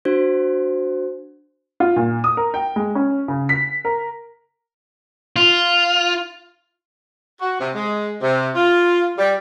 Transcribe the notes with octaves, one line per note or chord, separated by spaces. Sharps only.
D4 F#4 C5
F4
A#2
D#6
A#4
G5
G#3
C#4
C#3
B6
A#4
F4
F#4
C3
G#3
C3
F4
G3